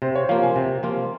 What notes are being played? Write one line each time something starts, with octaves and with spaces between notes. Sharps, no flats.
C3 C5
C#5
F3 A#3 F4 F5
G#5
C3
F3 A#3 F4